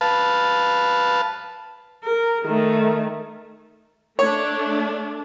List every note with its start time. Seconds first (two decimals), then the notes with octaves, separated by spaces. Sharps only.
0.01 B4 F5 A5
2.04 A#4
2.45 D#3 A3
4.19 A3 D4 C#5